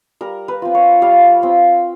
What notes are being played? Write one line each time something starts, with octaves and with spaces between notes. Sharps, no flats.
G3 A#4
B4
C4 F4
C#5
G3 F5
C4 F4